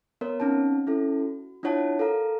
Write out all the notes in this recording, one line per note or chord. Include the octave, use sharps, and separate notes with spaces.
B3 A#4 C#5
C4 C#4 D#4 A5
C#4 E4 A4
F#4
D4 E4 F4 C#5 F#5 A5
A4 A#4 F5 A#5